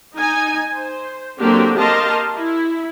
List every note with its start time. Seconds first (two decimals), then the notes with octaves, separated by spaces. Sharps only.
0.16 D#4 G#5
0.73 C5
1.39 D3 F#3 A#3 C4 D4 G4
1.79 G4 A#4 D#5 F5 A5 C6
2.35 E4